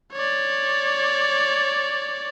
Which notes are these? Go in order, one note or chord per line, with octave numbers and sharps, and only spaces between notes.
C#5 D5